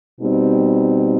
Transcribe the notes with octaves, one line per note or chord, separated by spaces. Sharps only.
B2 G3 C4 D#4